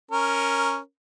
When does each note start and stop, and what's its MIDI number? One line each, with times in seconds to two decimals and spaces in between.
0.11 0.78 61
0.11 0.78 70